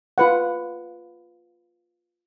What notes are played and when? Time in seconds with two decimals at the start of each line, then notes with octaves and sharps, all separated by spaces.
0.18 F4 B4 F#5